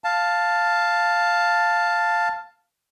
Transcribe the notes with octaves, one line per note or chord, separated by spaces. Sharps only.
F5 A5